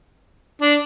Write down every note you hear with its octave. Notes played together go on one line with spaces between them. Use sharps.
D4